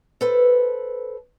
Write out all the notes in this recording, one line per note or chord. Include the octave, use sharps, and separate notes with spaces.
A4 B4 C5